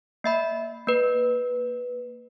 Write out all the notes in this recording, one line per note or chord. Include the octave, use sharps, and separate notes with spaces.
A#3 E5 B5
A#3 B4